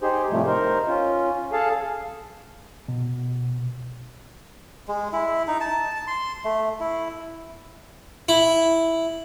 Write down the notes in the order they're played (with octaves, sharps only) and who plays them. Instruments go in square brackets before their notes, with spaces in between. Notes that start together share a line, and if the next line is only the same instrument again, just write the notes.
[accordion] D#4 G4 G#4 C5
A2 C3 F3 G3 A3
D#4 A#4 C5
C#4 F4
G#4 A4 F5 A5
[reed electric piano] B2
[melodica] G#3
E4
D#4
A5
C6
A3
E4
[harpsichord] E4